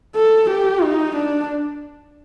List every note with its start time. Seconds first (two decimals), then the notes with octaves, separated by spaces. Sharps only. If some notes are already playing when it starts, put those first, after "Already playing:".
0.16 A4
0.50 G4
0.83 D#4
1.16 D4